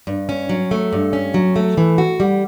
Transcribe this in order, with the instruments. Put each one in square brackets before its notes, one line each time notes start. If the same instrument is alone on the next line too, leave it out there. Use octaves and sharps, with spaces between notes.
[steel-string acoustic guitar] G2
C#4
F#3
A3
G2
C#4
F#3
A3
E3
F#4
G3